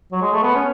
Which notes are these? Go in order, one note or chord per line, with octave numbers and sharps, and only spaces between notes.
F#3
G#3
A3
B3
C#4